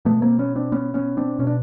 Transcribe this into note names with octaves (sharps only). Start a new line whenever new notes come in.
B2 A3 B3
A#3 C4
B3 C#4
C4 D4
B3 C#4
B3 C#4
C4 D4
B2 C#4
D4